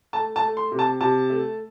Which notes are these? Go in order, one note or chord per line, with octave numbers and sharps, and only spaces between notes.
A3 A5
A5
A3
C6
C3
A5
C3 A5
A3